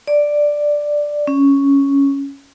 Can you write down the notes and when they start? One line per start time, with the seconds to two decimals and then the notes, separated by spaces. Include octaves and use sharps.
0.07 D5
1.27 C#4